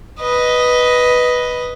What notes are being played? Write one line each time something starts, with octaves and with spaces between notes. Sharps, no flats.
B4 D#5